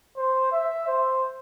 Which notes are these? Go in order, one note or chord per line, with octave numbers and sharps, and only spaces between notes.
C5
E5
C5